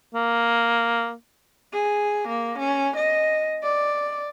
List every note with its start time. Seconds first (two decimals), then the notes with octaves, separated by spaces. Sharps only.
0.14 A#3
1.73 G#4
2.29 A#3
2.59 C#4
2.97 D#5
3.63 D5